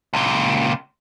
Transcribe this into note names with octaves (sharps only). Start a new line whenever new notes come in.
C#2 A#2